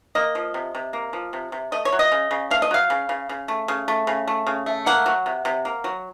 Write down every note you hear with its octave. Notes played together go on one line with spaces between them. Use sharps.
A#3 D#5
F3
C3
C3
A#3
F3
C3
C3
A3 D#5
C#5
F#3
D#5
C#3
C#3
A3 F5
D#5
F#3 F5
C#3
C#3
C#3
A3
C#3
A3
C#3
A3
C#3
A3
A#3 F#5
F#3
C3
C3
A#3
F#3